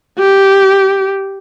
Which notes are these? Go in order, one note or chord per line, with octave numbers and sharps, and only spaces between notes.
G4